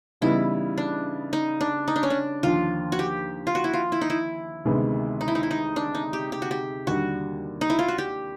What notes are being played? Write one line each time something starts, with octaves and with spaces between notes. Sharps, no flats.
C#3 E3 G3 B3 D#4 E4
D4
D#4
D4
D#4
D4
C#4
D4
D#2 D3 F3 F4
F#4
G4
F4
F#4
E4
F4
E4
D#4
E4
D2 C3 D#3 G#3 B3
D#4
E4
D#4
E4
D#4
D4
D#4
G4
G4
F#4
G4
D#2 D3 G3 F#4
D#4
E4
F4
F#4
G4